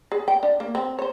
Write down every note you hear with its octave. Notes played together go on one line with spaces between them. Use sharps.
G#4
G5
D4
A#3
C4
C5 C#5